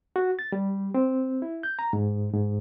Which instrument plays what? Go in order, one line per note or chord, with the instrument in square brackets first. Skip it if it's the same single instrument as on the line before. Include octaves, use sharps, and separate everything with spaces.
[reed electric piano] F#4
A6
G3
C4
E4
G6
A#5
G#2
G#2